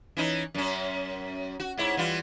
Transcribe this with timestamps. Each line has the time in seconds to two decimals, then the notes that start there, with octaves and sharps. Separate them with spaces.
0.17 E3 C#4 D#4
0.55 F#2 C#4
1.60 F#4
1.78 G#2 E4 C#5
1.97 E3 G3 F4